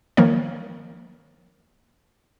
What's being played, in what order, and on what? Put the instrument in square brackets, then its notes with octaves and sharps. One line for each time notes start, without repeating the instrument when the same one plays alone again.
[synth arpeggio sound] D#3 F3 A#3 C#5